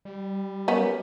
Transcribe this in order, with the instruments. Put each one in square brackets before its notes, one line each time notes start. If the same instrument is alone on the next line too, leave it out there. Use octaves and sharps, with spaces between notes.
[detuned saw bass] G3
[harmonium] F#3 A#4 [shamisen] B3 C#4